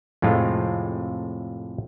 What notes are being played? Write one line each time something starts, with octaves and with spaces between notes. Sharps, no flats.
F2 A2 C3 G#3 F4